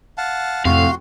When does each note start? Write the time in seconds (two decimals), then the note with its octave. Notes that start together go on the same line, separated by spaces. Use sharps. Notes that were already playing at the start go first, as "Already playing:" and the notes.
0.18 F5 F#5 A5
0.65 F2 A2 C3 F#4 F5 C6